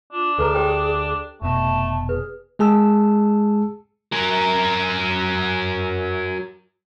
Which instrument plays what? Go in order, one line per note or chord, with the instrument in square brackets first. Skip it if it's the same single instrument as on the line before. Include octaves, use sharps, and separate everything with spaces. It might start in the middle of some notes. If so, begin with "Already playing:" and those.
[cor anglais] D4 [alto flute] F4
[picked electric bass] D2 [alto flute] G#4 [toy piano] A4 B4 A#5
[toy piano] G4 C5 G5
[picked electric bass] F1 B2 [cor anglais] A3 [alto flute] A5
[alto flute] G#4 [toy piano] B4
[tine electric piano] G#3 G#4 A5 E6
[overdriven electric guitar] F#3 A#4